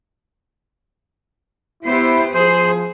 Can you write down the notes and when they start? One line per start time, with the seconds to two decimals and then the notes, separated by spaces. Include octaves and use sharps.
1.84 B3 E4 G4 C5
2.34 F3 G#4 C5